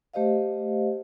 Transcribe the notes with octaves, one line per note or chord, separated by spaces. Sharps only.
A3 G4 C5 D#5 F5